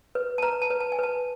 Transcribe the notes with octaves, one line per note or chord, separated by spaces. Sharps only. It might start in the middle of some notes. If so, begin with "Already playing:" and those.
B4
A5
B4 A#5
A5
B4
A5
G#5
B4 A5